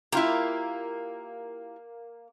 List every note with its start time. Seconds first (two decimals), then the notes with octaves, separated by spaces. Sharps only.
0.12 A#3 E4 F4 G4